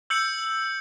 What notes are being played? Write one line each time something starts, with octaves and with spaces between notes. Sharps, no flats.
E6 G6 C#7 F#7